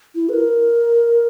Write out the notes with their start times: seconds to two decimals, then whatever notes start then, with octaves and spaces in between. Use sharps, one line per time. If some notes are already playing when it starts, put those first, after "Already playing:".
0.15 E4
0.29 B4
0.34 A#4